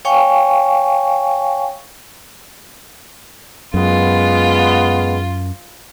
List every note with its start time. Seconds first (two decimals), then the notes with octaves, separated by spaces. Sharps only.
0.05 C#5 F5 G5 G#5 C#6
3.74 F#2 G#3 B3 F4